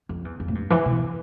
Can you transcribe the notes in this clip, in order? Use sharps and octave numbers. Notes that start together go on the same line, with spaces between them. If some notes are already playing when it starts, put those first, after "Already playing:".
F2
E2
F2
A2
G2
E3
B2